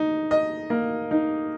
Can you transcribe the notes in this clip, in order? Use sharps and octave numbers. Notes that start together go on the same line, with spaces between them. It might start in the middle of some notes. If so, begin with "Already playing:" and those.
Already playing: D#4
D#5
A#3
D#4